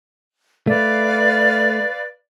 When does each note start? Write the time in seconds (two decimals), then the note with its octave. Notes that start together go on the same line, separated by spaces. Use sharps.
0.67 A3 B4 D5 F5